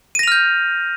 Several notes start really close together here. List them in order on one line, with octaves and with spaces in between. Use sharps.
D#7 A#6 F7 F6 G6